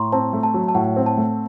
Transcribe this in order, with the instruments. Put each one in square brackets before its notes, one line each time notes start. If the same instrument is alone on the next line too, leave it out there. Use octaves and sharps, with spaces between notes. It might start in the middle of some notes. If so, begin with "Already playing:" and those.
Already playing: [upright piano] A2 [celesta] A#5 C6 C#6
[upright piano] C4 [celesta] A5
[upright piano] A3
[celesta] A5
[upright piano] F#3
[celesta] A5
[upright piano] A2 [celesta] F#5
[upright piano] C4
[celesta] A5
[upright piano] A3